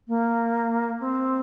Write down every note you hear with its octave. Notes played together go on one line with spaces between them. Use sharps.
A#3
C4